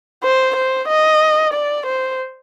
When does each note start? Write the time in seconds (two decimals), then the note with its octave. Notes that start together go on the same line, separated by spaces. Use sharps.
0.24 C5
0.56 C5
0.89 D#5
1.54 D5
1.86 C5